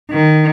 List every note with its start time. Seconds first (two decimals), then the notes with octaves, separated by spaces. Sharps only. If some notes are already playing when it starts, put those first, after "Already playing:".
0.11 D#3